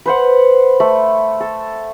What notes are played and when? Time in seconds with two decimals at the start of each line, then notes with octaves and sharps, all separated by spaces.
0.06 B4 C5 F#5
0.80 A3 B5
1.40 A4